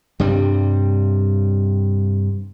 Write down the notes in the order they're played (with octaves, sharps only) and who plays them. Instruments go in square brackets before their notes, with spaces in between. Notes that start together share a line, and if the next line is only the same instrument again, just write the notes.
[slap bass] G2 C3 G3